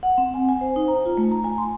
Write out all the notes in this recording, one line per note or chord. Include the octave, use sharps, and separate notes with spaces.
F#5
C4
G#5
G#5
C5
D#4
A#5
F4
A3
A#5
G#5
C6